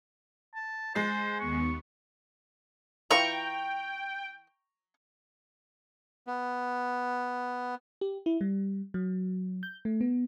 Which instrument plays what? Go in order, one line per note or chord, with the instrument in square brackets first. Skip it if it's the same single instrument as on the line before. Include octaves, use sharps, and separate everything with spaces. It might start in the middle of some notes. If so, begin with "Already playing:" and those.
[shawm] A5
[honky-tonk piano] G#3 A6 C7 [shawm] C5
[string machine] D#2 B3 [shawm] C#6
[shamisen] E3 E4 F4 [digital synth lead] G5 [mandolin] A#5 C#6
[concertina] B3
[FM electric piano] G4
E4
G3
F#3
G6
A3
B3